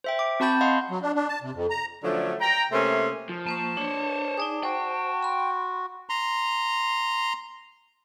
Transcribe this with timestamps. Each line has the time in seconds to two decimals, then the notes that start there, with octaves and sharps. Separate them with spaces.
0.04 C5 E5 G5
0.19 D6
0.40 C4 F#4 A5 B5 G6 A6
0.61 D#5 F5 F#5 C6
0.89 F#3
1.02 D4
1.15 D4
1.28 A5
1.42 C3
1.55 F2
1.70 A#5
2.03 D3 F3 F#3 A3 C#4 D4
2.41 G5 A#5
2.72 C3 A3 A#3 C#4 E5 C6
3.29 F3
3.47 A#3 C5 A5 C#6
3.77 D4 C5 C#5
4.37 D#4 G#4 D5 D6
4.63 F#4 C5 G5
5.23 B5 C6
6.09 A#5 C6